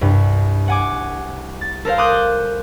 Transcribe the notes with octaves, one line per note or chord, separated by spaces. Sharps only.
C2 G2
F#5 G#5 D6
A6
A4 A#4 C5 F5
C6 D6 D#6 F#6 G6